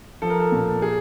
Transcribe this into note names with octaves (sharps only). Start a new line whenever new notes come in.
F3 A4
A#4
A4
A#2
G#4